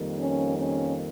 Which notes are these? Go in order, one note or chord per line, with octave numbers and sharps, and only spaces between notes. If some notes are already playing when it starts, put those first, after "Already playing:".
Already playing: F2 D#3 G3 A#3
C#4
C#4